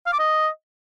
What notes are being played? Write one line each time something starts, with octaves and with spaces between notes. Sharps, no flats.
F5
D6
D#5